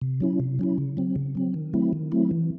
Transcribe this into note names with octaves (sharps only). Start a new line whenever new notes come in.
C3
F#3 C#4 E4
C3
F#3 C#4 E4
C#3
F#3 C4
C#3
F#3 C4
D#3
F#3 A3 C4 E4
D#3
F#3 A3 C4 E4
E3